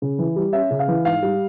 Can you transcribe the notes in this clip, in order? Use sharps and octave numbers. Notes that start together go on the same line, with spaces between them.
C#3
E3
G3
C#4 E5
C#3
F5
E3
G#2 F5
G3